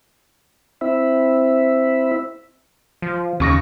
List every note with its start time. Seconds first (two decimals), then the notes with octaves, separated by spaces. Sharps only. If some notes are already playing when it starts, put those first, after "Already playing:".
0.81 C4 E4 E5
3.02 F3
3.40 D#2 C#3 C#6 A#6